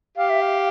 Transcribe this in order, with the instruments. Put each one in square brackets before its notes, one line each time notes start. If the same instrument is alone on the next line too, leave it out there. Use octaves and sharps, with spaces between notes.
[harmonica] G4 [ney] F5
[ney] E5
F5